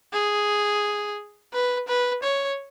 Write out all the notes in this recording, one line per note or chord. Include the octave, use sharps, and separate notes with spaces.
G#4
B4
B4
C#5